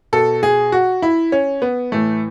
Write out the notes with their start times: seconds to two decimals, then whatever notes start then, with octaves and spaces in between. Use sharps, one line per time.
0.13 B2 A4
0.43 G#4
0.72 F#4
1.02 E4
1.32 C#4
1.62 B3
1.92 A2 E3 A3